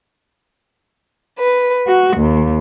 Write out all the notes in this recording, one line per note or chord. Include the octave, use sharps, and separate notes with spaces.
B4
F#4
D#2